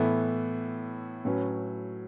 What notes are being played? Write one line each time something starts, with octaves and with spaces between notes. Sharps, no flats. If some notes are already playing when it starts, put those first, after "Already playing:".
Already playing: A2 E3 B3 E4 A4
A2 F#3 C#4 B4